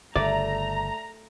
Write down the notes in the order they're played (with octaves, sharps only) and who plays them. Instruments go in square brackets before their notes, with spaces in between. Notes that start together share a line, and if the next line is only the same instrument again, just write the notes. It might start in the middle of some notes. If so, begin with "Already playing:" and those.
[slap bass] G1 C#3 [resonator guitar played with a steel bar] A3 [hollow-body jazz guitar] D5 [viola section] A#5